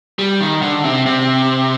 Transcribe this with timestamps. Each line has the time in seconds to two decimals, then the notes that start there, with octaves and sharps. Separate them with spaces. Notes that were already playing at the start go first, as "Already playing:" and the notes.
0.19 G3
0.40 D#3
0.62 D3
0.84 C3
1.06 C3